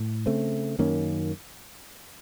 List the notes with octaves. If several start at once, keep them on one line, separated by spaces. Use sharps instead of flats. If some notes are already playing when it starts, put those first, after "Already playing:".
Already playing: A2
C#3 A3 C4
F#2 D#3 A#3 C#4